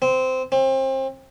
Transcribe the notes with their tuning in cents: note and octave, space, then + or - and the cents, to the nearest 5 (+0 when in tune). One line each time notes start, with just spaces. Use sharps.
C4 -15
C4 +30